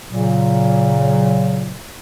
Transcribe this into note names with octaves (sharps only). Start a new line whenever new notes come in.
A#2 C#3 F#3